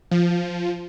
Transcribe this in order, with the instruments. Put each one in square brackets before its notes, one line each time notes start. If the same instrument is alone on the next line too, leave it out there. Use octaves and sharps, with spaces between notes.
[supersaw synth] F3